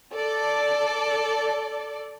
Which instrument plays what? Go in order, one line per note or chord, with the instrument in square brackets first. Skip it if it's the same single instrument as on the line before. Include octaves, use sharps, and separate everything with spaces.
[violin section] A4 D5